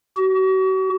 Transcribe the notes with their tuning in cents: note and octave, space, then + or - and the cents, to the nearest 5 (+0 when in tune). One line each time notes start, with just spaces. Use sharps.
F#4 +40